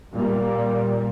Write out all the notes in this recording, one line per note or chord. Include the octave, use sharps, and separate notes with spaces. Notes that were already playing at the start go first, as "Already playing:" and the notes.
A#2 G3 A#3